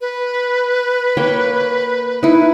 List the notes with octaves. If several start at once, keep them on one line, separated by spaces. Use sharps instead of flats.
B4
A#3 C#5 G5
D#4 E4